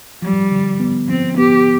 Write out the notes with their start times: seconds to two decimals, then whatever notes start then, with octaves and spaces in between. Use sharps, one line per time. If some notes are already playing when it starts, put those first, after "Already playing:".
0.22 F3 G3
0.51 D3
0.80 B3
1.09 F3 C4
1.38 B3 G4